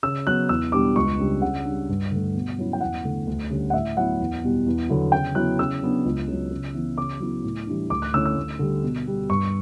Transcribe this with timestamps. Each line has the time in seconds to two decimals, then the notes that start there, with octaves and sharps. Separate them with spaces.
0.03 C#3 E6
0.27 F#3 B3 F#6
0.49 E2 E6
0.72 B2 G3 D4 D6
0.96 C#2 C#6
1.19 C#3 G3 D4
1.42 C#3 F#5
1.65 G3 D4
1.89 G2
2.11 D3 A3
2.34 B2
2.59 F#3 C#4 E4
2.73 G5
2.81 E2 F#5
3.05 D3 A3
3.27 D2
3.50 D3 G3 C#4
3.70 F#5
3.73 A2 E5
3.97 F#3 B3 E4 F#5
4.20 E2
4.44 B2 G3
4.66 E2
4.89 D3 F#3 B3 E4
5.12 C#3 G5
5.35 F#3 B3 E4 F#6
5.59 C#3 E6
5.83 F#3 B3 D4
6.05 C#2
6.28 C#3 F#3
6.51 C#3
6.74 E3 B3
6.97 C#3 D6
7.20 F#3 B3 E4
7.44 A2
7.67 E3 G3 D4
7.90 D2 D6
8.02 F#6
8.14 D3 A3 C#4 E4 E6
8.25 E6
8.36 D2
8.59 D3 G3
8.82 B2
9.06 G3 B3
9.30 G2 C#6